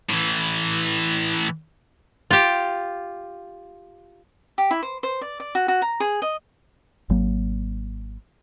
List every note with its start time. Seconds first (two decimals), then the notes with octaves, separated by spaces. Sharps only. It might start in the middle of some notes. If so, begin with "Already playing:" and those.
0.09 A2 E3
2.31 F4 G4
4.58 G4
4.71 E4
4.83 C5
5.03 C5
5.21 D5
5.40 D5
5.55 F#4
5.68 F#4
5.82 A#5
6.00 G#4
6.22 D#5
7.09 G#1 F#3 A#3